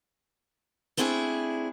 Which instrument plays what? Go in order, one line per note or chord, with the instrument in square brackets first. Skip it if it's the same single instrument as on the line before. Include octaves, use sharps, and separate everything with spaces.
[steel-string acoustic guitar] A3 C4 D4 E4 G#4